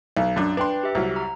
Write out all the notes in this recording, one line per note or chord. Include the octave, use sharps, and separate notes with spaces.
B1
F#2 D4
D4 B4 G5 C6
G4 E5
C2 F#3
A#5